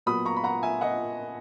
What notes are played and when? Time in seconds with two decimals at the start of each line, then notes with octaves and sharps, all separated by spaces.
0.06 A#2 F#3 B3 B5 D#6
0.25 A#5 C#6
0.36 B5
0.44 F#5 A#5
0.63 E5 G#5
0.81 D#5 F#5